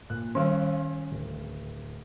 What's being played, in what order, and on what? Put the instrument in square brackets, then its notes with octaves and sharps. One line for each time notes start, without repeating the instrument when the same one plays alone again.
[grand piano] A#2 F#6
[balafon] D#3 G3 [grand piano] C#4 F5
[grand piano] D1